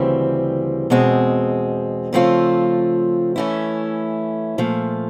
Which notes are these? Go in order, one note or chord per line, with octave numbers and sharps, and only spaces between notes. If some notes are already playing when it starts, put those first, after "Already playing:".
Already playing: D2 C#3 E3 G3 C4
E2 B2 G#3 C4
C#3 F3 A3 C4 F4
E3 A3 C#4 E4
A#2 F3 A3